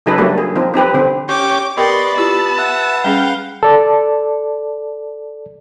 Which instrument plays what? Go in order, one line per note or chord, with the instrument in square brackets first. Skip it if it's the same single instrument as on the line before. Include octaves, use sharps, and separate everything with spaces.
[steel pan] C#3 F#3 D#4 G#4 A4 B4
F#3 G3 A3 A#3 D4
G#4
F3 C4 D#4
C4 D#4 G4 B4
D3 C4
[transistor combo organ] C#4 G4 [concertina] G5 [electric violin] D6
[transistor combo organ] B3 [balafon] G4 A#4 G5 [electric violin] D5 C6 [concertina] D#5 C#6
[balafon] E4 F4 G4 [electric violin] A5 [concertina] E6
[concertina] B4 F#5 [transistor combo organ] E5
[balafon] G3 C#4 G#4 [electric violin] F5 [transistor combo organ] G5
[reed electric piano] A4 D5